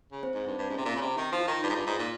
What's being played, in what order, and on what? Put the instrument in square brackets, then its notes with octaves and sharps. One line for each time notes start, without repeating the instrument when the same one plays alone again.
[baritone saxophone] C#3
[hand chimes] C4 C5
[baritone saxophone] G#2
G2
G2
[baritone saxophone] G#2 [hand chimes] C#4
[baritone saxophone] C3
A#2
[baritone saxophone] C#3 [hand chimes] C4
[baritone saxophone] C3
[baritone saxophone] D#3 [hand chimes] D#4
[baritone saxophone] F3
[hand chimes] F4
[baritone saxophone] D#3
G2
G#2
G2
G#2
A#2